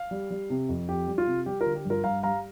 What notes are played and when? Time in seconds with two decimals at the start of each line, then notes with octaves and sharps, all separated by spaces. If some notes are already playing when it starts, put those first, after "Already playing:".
Already playing: F5
0.11 G3
0.31 G3
0.50 C3
0.69 F2
0.88 F2 G4
1.07 G3
1.18 F4
1.27 C3
1.46 G3 G4
1.61 F4 A#4
1.66 D3
1.75 G4
1.85 G2 F4 A#4
2.04 G2 F5 A#5
2.23 G3 F5 A#5